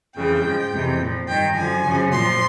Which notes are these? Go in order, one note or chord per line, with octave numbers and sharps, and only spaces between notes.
F2 C#3 E3 G5
G#2 F3
F2 C3 E3
A#2 F3
G2 D#3 G5
F#2 D3 F3 G#5
F#2 C#3 F3
A#2 F3 C6